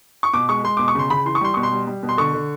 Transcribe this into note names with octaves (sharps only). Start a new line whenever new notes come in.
C#6
B2 D6
G#3 C#6
G#3 C6
B2 D6
C#6
C#3 C6
C#3 B5
E3 C6
C#6
G3 C6
B2 C#6
C6
G3
G3
B2
C6
D3 C#6
D3